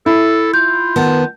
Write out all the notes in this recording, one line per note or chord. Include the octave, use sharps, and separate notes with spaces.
E4 A4
F4 G6
D#3 B3 A5